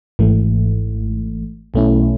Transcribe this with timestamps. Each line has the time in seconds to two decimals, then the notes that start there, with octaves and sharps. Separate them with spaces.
0.19 G#1 G#2 E3 A3
1.74 B1 B2 A3 C#4 E4